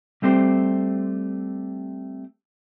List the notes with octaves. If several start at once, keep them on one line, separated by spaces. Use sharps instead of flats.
G3 A3 C4 G4 C5